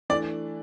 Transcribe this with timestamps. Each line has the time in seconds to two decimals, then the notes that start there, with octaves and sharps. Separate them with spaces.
0.10 E3 A3 D4 D5